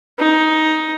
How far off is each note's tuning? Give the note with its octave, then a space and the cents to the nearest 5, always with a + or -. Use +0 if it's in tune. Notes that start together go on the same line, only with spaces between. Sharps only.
D#4 +10